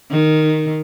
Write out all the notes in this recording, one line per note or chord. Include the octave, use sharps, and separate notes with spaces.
D#3